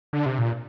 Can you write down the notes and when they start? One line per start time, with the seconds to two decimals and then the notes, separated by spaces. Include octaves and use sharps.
0.13 D3
0.26 C3
0.38 A#2